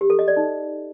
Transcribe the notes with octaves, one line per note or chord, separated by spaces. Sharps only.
G4
A4
D#5
D5
D#4